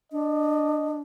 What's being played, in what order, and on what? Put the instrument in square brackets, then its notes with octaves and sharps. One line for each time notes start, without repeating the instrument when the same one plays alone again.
[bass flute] D4 [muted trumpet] D#5